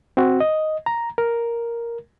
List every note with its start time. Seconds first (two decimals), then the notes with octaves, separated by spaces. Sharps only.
0.17 C4 F#4
0.40 D#5
0.86 A#5
1.18 A#4